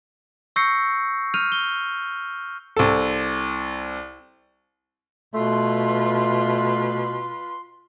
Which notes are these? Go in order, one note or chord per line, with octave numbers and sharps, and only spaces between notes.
C#6 E6 G6 A#6 C7 C#7
F6 G6 D#7 F7
G7
C2 A4
B2 A3 F4 B4 C6